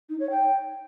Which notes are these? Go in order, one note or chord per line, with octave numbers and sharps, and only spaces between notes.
D#4
C#5
G5